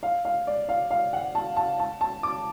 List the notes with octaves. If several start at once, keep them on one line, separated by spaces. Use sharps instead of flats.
F5
F5
D5
F5
F5
F#5
A5
A5
A5
A5
D6